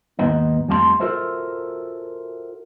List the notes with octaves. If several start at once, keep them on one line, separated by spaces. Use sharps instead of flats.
D#2 G#2 B3 D#4
F2 G3 A3 F5 A5 C6
F4 F#4 A4 A#4 C5 E5